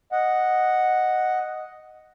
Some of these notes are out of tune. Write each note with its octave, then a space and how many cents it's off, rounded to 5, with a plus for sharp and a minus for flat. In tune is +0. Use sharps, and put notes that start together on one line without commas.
D#5 +0 F#5 +0